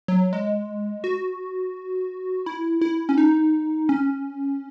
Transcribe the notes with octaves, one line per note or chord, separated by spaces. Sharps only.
F#3
G#3
F#4
E4
E4
C#4
D#4
C#4